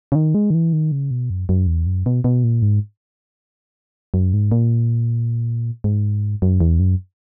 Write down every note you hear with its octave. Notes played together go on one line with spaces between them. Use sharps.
C#3
D#3
G#3
D#3
E3
D#3
C#3
B2
F#2
F#2
E2
F#2
B2
B2
A#2
G#2
F#2
G#2
A#2
G#2
F#2
E2
F#2